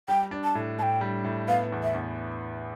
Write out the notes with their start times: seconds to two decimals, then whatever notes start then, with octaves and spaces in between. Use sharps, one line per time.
0.08 G3 G5
0.31 D4
0.44 A5
0.55 A2
0.79 A2 G5 A5
1.01 G3
1.24 A2
1.48 B3 F5
1.72 E2
1.83 E5
1.94 E2